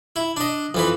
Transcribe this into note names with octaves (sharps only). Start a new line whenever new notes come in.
E4
D4 D#5
F2 E3 B4